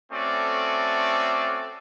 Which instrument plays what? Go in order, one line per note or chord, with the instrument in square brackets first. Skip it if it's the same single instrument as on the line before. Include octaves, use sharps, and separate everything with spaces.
[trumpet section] A3 C4 C#4 F#4 A4 D5